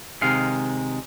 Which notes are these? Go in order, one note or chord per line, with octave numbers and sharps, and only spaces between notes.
C3 D#3 G#3 F5